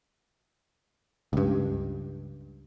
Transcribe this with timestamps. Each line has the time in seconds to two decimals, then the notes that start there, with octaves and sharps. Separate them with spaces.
1.33 C#2 G2